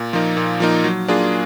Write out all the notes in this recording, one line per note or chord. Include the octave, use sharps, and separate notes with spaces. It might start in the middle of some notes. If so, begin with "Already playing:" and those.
Already playing: A#2
F3 A#3 D#4
A#2
F3 A#3 D#4
F#3
A#3 D4 F4 G#4